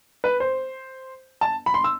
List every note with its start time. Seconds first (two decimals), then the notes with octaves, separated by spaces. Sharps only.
0.24 B4
0.40 C5
1.41 A5
1.66 B5
1.74 C6
1.84 E6